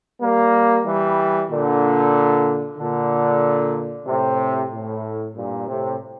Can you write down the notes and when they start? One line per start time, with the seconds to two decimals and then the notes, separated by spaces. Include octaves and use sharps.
0.21 G3 A#3
0.85 E3 G3
1.50 A#2 D3
2.78 A#2 D3
4.07 A2 C3
4.72 A2
5.36 G2 A#2
5.68 A2 C3